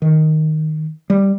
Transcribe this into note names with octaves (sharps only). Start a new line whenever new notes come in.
D#3
G3